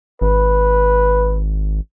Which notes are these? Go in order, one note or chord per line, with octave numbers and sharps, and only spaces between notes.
G#1 B4